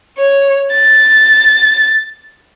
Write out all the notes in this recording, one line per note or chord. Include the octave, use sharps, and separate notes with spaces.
C#5
A6